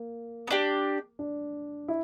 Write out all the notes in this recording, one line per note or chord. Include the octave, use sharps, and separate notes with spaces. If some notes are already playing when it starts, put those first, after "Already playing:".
Already playing: A#3
B3
D4 G4
D4
E4